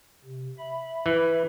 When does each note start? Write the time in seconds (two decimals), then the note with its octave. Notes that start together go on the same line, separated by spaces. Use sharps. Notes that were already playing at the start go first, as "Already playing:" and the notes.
0.24 C3
0.58 E5 B5
1.06 E3